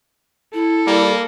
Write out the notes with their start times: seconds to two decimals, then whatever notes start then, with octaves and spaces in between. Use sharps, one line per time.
0.54 E4 A4
0.87 G3 A#3